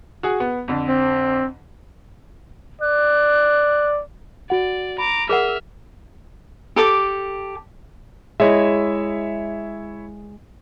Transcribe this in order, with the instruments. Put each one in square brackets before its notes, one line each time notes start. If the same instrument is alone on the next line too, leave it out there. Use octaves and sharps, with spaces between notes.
[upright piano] F#4 G#4
B3
F2 D3
[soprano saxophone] C4
[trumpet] D5 [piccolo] F#6
[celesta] F#4 F#5 [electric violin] D5
[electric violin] A#5 D6 [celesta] B5
[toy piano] G#4 A#4 F#5 [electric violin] E5 F6
[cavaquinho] G4 A4 D6
[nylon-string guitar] G#3 [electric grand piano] E4 C#5 E5